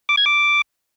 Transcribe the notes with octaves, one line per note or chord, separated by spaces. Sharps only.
D6
G#6
D6